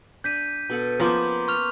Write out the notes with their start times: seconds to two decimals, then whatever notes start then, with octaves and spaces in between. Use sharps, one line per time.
0.24 D4 G6 B6 D#7
0.70 B2 A4 F#5
1.00 F3 A#3 B3 C#4 A#5 C6 D6
1.48 C#6 F6 F7